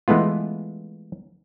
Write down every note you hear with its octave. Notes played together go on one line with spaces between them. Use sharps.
E3 G#3 A3 B3 F4